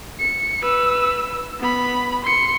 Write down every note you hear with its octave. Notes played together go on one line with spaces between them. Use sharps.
C#7
B4 E6
B3 B5
C6 C#7